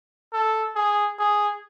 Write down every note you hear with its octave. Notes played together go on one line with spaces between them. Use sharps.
A4
G#4
G#4